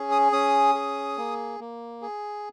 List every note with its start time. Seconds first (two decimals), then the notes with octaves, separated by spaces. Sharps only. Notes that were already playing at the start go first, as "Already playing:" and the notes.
Already playing: C#4 G#4
0.11 D#6
0.32 C#4 D#6
0.75 G#4
1.18 A#3
1.60 A#3
2.02 G#4